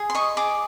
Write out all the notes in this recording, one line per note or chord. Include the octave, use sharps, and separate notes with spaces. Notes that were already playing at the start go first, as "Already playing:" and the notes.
Already playing: G#4
C6
D#5 C#6
G#4 D6